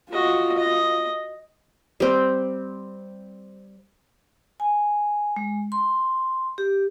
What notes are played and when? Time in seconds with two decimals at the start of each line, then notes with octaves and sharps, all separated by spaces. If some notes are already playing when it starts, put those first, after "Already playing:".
0.12 F4 F#4 D#5
0.58 D#5
2.00 G3 C4
4.60 G#5
5.36 G#3
5.72 C6
6.58 G4